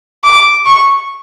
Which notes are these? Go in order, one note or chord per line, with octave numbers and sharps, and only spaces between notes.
D6
C#6